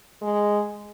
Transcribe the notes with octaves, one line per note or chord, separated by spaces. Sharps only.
G#3